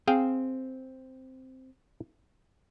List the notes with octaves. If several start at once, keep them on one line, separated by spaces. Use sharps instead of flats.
C4 G#4 F5 G5